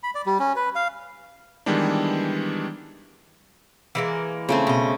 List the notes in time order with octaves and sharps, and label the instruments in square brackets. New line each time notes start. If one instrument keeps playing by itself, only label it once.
[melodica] B5
D5
G3
C#4
B4
F5
[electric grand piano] D#3 E3 G3 G#3 B3 D4
[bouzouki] E3 G#3 A#3
[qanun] C#3 A3 C4
[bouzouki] B2 D#5